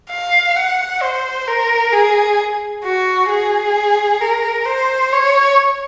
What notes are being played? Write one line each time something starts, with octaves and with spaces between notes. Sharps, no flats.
F5
F#5
C5
A#4
G#4
F#4
G#4
A#4
C5
C#5